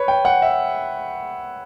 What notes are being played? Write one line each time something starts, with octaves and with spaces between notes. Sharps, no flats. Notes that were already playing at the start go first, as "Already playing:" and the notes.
Already playing: B4 C#5
G5
F#5
E5